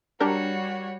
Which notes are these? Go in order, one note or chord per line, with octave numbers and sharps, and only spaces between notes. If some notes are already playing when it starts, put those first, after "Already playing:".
G3 D4 F#4 G4 A#4 C#5